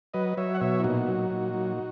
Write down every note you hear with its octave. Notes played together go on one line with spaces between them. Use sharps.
F#3 B4 D#5
F#3 C#5 E5
F#5
B2 C#5 E5
E4
A#2 D#4 F#4
F#3
A#2
F#3